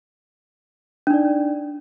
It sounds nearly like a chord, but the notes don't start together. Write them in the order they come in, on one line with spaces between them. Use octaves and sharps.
D4 D#4 D5